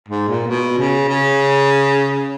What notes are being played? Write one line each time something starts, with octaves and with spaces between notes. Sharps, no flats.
G#2
A#2
B2
C#3
C#3